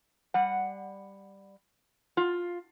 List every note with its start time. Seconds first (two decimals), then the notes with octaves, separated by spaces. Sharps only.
0.34 G3 F#5
2.17 F4